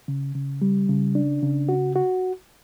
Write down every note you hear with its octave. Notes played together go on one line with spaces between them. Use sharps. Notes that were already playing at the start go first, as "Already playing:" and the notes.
C#3
C#3
G3
C#3
D4
C#3
F#4
F#4